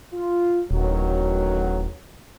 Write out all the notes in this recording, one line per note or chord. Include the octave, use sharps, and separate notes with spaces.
F4
D#1 A1 D#3 F#3